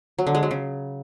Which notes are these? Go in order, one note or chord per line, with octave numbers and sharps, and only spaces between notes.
F#3
D3
G#3
F#3
C#3